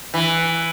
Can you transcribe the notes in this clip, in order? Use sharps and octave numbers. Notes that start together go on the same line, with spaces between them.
E3